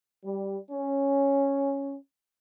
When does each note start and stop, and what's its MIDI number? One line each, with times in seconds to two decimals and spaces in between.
0.24 0.56 55
0.71 1.94 61